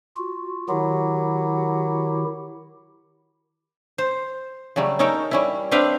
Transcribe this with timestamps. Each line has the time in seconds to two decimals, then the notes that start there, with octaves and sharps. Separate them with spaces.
0.17 F4 F#4
0.69 D#3 F#3 E4 G4
3.98 C5
4.76 C#3 F#3 G3 A3
4.99 C#4 D#4 A4 A#4 G5
5.31 G3 C#4 E4
5.71 C4 D4 B4 E5 F5 G5